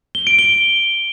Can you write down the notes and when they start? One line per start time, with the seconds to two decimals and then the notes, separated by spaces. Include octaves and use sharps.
0.15 G7
0.27 D7
0.39 G7